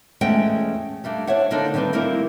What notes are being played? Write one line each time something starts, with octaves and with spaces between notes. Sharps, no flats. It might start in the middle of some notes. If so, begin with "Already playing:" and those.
E2 G#3 A3 C#4 F#5 G5
G3 A3 A#3 D4
D4 C5 C#5 E5 F#5
D3 A#3 D4 D#4
D#3 G3 C4 D4 B4
G3 A#3 C4 D#4 E4 A#4